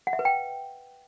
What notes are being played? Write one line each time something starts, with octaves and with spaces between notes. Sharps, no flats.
F#5
E5
B4
G5